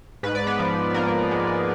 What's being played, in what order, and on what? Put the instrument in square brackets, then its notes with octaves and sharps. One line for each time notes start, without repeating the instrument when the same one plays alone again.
[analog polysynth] G#2 B4
D5
B3 B4
F3
G#2 A#3 A#4
G#3